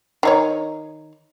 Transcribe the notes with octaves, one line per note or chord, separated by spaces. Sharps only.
D#3 D#4 C#5